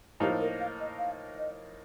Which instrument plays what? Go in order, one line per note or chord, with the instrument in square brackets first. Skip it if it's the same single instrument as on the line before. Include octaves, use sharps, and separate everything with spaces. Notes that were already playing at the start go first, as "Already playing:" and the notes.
[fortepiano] A2 F3 A#3 D#4 [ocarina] G4
[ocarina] A#4
F5
D#5
F5
D#5